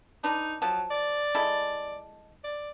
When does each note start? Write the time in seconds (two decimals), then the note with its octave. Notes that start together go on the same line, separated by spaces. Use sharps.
0.24 D4 D#4 B4
0.62 F3 F#3 A5
0.90 D5
1.35 G#3 E4 A4
2.44 D5